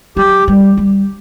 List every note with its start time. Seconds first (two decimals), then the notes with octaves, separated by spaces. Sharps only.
0.17 F#3 G4
0.48 G3
0.77 G3